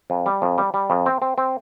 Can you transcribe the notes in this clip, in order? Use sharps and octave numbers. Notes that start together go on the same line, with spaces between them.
F2
G3
F2
G3
G3
F2
C4
C4
C4